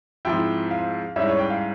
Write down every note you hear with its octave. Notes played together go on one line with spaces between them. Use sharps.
G#2 F3 C4 E4 G5
F5
G#2 G3 C#4 E4 E5
C#5
G5
F5